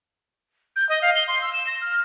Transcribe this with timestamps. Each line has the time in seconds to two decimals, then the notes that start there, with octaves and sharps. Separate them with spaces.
0.76 G6
0.89 D#5
1.02 F5
1.15 G7
1.28 C6
1.42 E6
1.53 E7
1.67 A#6
1.81 F6